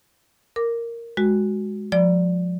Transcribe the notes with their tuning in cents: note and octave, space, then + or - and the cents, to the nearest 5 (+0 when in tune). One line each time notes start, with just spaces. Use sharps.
A#4 -5 D6 +0
G#3 +0 F#4 +0
F3 +30 D5 +0